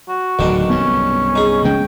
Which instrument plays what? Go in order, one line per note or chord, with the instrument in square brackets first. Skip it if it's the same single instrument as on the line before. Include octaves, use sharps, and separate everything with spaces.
[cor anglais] F#4
[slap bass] D1 B2 [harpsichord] B1 D#3 D4
[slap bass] C2 G2 B3 [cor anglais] C#4
[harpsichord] D#4 G#4
[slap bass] C#3 G#3 B3 [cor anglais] G5